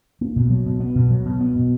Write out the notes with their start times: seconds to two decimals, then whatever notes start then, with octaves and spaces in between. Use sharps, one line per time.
0.21 A#3
0.36 B2
0.50 F#3
0.66 B2
0.80 B3
0.95 B2
1.11 F#3
1.25 B2
1.41 B3
1.55 B2